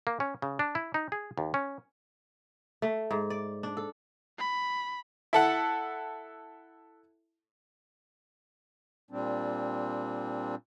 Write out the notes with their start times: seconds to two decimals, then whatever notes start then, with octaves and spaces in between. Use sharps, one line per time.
0.07 A#3
0.20 C#4
0.42 C#3
0.59 D4
0.75 E4
0.94 D#4
1.12 G#4
1.38 D#2
1.54 C#4
2.82 A3
3.11 G#2
3.30 D5
3.63 D4
3.77 A4
4.38 B5
5.33 E4 A4 F#5
9.11 A#2 G3 C4 D4